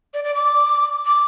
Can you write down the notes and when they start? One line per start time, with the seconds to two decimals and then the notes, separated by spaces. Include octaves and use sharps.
0.14 D5
0.24 D5
0.35 D6
1.06 D6